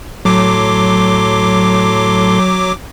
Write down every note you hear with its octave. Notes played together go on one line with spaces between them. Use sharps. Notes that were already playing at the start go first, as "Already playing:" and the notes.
A2 F#3 A4 C6 D6